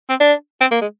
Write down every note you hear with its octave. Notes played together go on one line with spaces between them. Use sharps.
C4
D4
C4
A#3
G#3